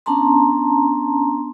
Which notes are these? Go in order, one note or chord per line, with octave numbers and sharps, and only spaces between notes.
B3 C#4 D4 A5 A#5 C6